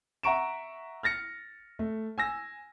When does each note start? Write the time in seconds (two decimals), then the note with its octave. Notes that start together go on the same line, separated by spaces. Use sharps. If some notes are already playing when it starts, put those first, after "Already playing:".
0.23 E5 F#5 A#5 C#6 D7 E7
1.03 F6 A6 A#6 C#7
1.79 A3
2.18 G#5 E6 A#6